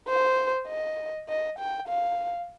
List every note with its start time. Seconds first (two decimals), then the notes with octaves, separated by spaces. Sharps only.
0.08 C5
0.68 D#5
1.29 D#5
1.59 G5
1.88 F5